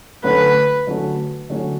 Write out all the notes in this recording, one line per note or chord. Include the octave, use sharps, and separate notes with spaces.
D3 F#3 A3 C#4 F#4 B4
D3 F#3 A3 C#4 F#4
D3 F#3 A3 C#4 F#4